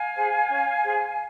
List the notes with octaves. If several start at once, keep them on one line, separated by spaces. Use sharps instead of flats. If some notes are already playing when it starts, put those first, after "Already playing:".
Already playing: F5 G#5
G#4 C5
C#4
G#4 C5